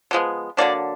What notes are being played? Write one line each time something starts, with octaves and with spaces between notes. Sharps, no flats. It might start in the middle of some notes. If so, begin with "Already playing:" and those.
D3 F3 G#3 B3
D3 F#3 A#3 D4 D5